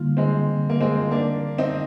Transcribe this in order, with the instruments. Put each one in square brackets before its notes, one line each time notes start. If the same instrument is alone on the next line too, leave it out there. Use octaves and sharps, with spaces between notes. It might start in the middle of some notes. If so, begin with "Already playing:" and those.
Already playing: [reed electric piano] D3 G3 A#3 D#4 [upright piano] F4
[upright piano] G#3 C4
A#3
G#3 C4
A#3 D4
C4 D#4